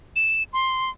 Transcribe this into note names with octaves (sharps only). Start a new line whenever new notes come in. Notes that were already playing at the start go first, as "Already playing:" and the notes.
E7
C6